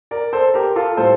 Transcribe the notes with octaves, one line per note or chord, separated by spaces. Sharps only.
A#4 D5
A4 C5
G4 A#4
F4 A4
A2 G3 A4 C5